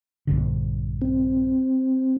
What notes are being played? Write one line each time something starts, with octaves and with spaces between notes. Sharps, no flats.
A#1 G2 D3
C4